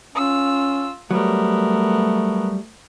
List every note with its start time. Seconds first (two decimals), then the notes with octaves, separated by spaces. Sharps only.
0.15 C#4 F4 E6
1.11 F#3 G3 A3 B3 A#4